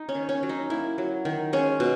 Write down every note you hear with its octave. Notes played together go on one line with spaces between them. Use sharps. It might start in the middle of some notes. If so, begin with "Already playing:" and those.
Already playing: D#4
C#4
D#3
C#4
F#3
D#4
A#3 E4
F#3
D#3
G#3 C#4
B2